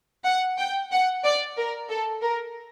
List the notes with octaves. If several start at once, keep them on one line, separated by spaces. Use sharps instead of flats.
F#5
G5
F#5
D5
A#4
A4
A#4